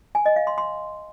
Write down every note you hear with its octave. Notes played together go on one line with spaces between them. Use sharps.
G#5
D#5
F5
C6
C6